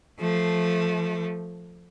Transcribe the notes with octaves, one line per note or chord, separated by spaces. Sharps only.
F3 A3